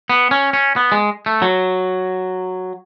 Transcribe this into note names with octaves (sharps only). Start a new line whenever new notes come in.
B3
C#4
C#4
B3
G#3
A3
F#3